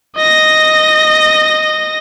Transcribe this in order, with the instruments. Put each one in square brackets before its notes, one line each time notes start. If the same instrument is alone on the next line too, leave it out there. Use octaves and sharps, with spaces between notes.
[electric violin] D#5 A#6